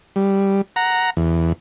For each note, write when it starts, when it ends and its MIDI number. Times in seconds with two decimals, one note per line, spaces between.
0.16 0.61 55
0.76 1.10 78
0.76 1.10 82
1.17 1.53 40